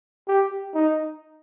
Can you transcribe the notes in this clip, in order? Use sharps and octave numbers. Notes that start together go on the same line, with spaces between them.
G4
D#4